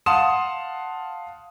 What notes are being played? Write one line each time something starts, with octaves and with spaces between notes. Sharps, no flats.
F5 F#5 A5 C6 D#6 E7